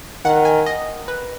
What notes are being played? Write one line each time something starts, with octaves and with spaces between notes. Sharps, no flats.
D#3 F#5
G#5
D#5
B4